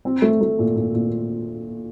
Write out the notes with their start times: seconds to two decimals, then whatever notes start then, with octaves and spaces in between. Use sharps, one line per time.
0.05 C4
0.22 A3
0.41 A3
0.59 A#2
0.76 A#2
0.94 A#2